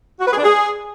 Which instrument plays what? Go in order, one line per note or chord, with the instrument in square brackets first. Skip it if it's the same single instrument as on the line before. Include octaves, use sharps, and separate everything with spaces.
[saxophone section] F#4
B4
G#4
D4
G#4